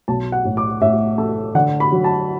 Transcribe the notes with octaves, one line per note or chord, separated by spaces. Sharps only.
B1 A5
F#5
A2
D6
A2 E5
A3
D3 F#5
B5
F#3
A5